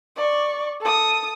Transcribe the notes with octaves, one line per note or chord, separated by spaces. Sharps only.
D5 C#6
A4 D#6